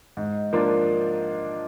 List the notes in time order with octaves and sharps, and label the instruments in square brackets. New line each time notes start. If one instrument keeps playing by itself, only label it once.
[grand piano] G#2
F3 A#3 D4 F4